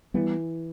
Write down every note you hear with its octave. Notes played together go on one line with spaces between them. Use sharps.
E3 G3 B3